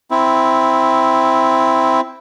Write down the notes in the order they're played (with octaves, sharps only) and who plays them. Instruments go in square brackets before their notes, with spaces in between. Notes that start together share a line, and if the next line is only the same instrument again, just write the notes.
[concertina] C4 E4